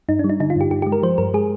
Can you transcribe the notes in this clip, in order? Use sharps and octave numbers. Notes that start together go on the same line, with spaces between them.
G2 D#4
D4
G3
D#4
D3 D#4
F4
G2 G4
G2 G4
G#3 G4
A#4
F3 C5
G2 A#4
G#3 G#4